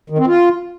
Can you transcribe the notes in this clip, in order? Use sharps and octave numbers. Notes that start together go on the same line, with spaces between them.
D#3
C4
F4